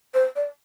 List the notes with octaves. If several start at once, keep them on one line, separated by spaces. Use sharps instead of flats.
C5
D5